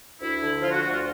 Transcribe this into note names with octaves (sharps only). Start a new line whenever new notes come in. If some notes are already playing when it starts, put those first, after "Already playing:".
D2 E4
D3
F3 F4
F#4
D2 F#4
F4